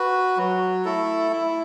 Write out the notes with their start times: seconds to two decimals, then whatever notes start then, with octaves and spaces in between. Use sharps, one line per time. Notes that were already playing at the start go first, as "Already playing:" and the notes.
Already playing: F#4 B4
0.37 F#3
0.85 A3 E4 A4
1.31 E4